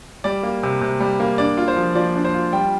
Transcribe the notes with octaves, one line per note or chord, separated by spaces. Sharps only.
G3 D5
A#3
C3
C3
G3
A#3
D4 D5
F4
C5
F3
F3 D5
D4
C5
F4
G3 G5